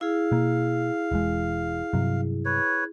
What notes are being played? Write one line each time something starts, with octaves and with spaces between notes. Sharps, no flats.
E4 G#4 F5
B2 A#3
E1 E2 G#3
G2 C3 F#3
B4 C#5